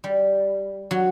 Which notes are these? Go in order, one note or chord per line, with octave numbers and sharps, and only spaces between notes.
G3
F#3